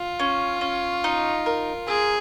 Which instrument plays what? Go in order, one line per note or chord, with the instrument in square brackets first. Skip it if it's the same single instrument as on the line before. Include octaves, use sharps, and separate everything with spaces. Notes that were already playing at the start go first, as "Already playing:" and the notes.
Already playing: [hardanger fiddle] F4
[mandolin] C#4
C#4
D#4
A#4
[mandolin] C4 [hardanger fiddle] G#4